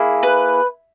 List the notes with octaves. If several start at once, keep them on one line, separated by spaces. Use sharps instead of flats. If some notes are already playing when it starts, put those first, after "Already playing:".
Already playing: A#3 E4 G#4
B4